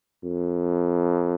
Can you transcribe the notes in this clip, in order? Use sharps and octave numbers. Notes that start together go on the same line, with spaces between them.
F2